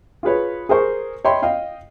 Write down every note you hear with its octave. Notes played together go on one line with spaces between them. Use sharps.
F4 G#4 B4 C#5
G#4 A#4 C5 C#6
C#5 D#5 E5 G5 B5 C6
D#5 F5 G5